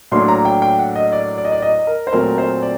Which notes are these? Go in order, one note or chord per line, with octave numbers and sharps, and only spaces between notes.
A2 F#3 A#3 D4 C6
A#5
G5
G5
F#5
D#5
D5
D5
D#5
D5
D#5
A#4
C5
A#2 F#3 A3 C4 A#4
C5
D5